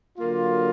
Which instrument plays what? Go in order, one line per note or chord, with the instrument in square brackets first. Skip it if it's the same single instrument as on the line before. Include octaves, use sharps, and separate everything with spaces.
[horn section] D3 F#3 A#3 F4